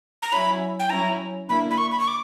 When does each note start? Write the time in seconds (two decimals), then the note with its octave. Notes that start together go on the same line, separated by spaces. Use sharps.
0.22 A#5
0.32 F#3 C#4 E4 B5
0.80 G5
0.90 F#3 C#4 E4 A#5
1.49 D3 A#3 E4 B5
1.71 B5
1.78 C#6
1.91 B5
1.99 C#6
2.08 D6